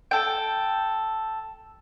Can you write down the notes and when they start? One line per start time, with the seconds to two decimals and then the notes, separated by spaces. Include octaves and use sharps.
0.11 A4 G5